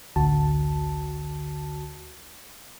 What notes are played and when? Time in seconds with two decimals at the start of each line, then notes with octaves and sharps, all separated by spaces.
0.16 A1 D2 D3 F#4 A5